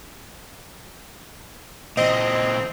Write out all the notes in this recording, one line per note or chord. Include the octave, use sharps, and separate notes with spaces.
A#2 E3 C4 D#5